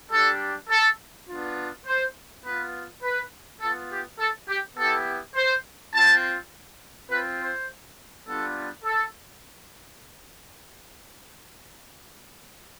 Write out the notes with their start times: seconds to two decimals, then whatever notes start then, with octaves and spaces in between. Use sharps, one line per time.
0.12 G3 D4 G4 A4
0.70 A4
1.29 B3 D4 F4
1.86 C5
2.44 B3 F4 B4
3.03 B4
3.61 B3 F4 A4
3.91 G4
4.19 A4
4.48 G4
4.77 B3 E4 G4 A4
5.35 C5
5.94 C4 F4 A5
7.10 C4 F4 B4
7.40 C5
8.27 G3 B3 D4 F4 A4
8.85 A4